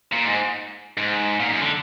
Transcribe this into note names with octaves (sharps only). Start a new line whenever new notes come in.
A#2
G#2
G#2
A#2
F#2
D3